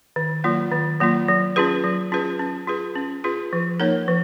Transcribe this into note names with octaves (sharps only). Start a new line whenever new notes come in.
D#3
F#3 A#3 F4
D#3
F#3 A#3 F4
F#3
C#4 F4 G#4 B4
F#3
C#4 F4 G#4 B4
C#4
F4 G#4 B4
C#4
F4 G#4 B4
F3
A#3 D#4 A#4 C#5
F3